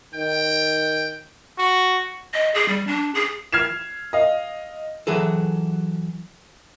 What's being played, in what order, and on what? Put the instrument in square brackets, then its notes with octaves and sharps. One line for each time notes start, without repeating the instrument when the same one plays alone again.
[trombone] D#3 [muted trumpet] G5
[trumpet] F#4
[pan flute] D#5
G#4
G3
D4
G#4
[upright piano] F6 G#6 C7 E7
D#5 F5
[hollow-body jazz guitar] E3 F#3 G#4 A4